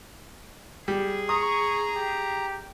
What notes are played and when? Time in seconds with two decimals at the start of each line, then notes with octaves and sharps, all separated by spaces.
0.88 G3 G#4
1.29 A#5 C#6 D#6
1.95 G4